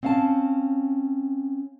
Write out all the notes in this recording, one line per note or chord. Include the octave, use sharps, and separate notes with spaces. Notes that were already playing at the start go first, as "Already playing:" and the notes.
C4 C#4 F5 F#5 A5